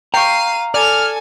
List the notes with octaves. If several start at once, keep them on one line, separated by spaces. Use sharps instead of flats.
F5 G5 A#5 C#6 C7 D#7
A4 D5 G#5 F6